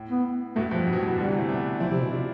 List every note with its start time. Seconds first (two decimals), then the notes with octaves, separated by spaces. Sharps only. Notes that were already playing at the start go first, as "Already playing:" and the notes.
Already playing: A2
0.10 B3
0.55 G2 B2 A3
0.71 G2 B2 F3
0.87 G2
0.93 B2
0.97 A2
1.08 G2 B2
1.18 B2 D3 G3
1.28 C3 E3
1.38 A3 C4
1.49 B3 D4
1.80 F3 C4 E4
1.91 C3
2.01 B2
2.10 C3 D4 F4